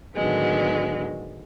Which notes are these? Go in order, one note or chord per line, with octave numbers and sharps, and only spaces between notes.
A2 D3 D#3 F#3 G#3 B3